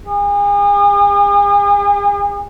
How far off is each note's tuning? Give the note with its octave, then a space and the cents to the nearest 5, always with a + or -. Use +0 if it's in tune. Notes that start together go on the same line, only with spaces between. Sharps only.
G#4 -40